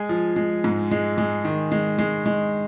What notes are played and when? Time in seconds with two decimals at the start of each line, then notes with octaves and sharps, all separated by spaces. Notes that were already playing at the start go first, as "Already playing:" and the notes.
Already playing: G#3 G#5
0.09 F3
0.36 G#3
0.64 G#2
0.91 G#3
1.18 G#3
1.45 D#3
1.72 G#3
1.99 G#3
2.26 G#3